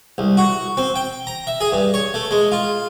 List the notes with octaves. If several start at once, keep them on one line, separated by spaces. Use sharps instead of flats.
C2
F#4
C4
G5
A#5
E5
G#4
G2
C#5
A3
G#3
F4